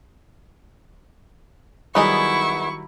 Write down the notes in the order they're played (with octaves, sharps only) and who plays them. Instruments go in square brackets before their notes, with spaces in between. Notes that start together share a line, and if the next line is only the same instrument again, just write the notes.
[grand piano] D#3 F#3 G3 [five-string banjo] B3 D#4 G#4 [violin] E4 [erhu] C#6